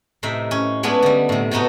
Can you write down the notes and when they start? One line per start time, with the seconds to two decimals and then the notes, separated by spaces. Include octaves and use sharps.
0.23 A2 C3 D#4 E5
0.51 C#4
0.83 G#3 B3 C#4 D4 E4
1.02 D3 G3
1.29 A2 C3
1.51 B2 A3 B3 D#4 F#4